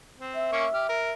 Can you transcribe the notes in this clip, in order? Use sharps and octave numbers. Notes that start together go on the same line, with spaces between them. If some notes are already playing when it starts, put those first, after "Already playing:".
C4
E5
A#3 C#4 C#5
G4 F6
A#4